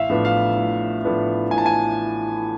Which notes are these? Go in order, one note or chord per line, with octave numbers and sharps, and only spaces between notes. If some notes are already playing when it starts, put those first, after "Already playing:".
Already playing: A1 E5 F5
A2 F3 B3 D4
F5
A1
A2 F3 B3 D4
A1 G#5
A5
G#5